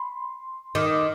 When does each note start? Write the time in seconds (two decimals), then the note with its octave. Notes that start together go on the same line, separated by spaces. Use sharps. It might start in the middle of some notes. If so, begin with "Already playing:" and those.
Already playing: B5 C6
0.75 D#3 D6